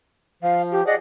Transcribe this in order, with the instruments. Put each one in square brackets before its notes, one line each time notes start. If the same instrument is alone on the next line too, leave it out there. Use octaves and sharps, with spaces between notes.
[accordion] F3 [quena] F5
[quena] G4
[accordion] G#4 D5 F#5 [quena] D#5